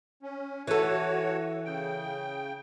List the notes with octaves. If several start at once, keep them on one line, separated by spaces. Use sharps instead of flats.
C#4
E3 F#4 A4 C#5
C#3 G5